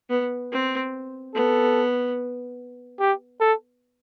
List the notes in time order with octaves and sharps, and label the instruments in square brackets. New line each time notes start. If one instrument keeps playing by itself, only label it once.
[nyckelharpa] B3
C4
[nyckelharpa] B3 [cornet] A4
[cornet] G4
A4